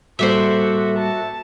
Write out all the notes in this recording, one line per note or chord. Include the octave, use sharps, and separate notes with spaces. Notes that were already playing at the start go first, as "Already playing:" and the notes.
A2 G3 A#3 F#4 A4 C5 D5 E5
A5